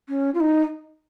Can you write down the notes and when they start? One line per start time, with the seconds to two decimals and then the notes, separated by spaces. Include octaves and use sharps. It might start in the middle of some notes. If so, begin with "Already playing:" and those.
0.08 C#4
0.34 F4
0.40 D#4